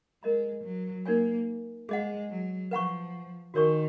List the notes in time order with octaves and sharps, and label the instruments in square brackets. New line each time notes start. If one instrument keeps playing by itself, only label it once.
[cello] G#3 [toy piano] A#4 D#5 A#5
[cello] F#3
[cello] A#3 [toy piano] D#4 A#4 C#5 G#5
[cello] G#3 [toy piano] G#4 D#5 F#5
[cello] F#3
[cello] F3 [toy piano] B4 F#5 A#5 C#6
[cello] D#3 [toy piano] F#4 A#4 C#5 G#5 C#6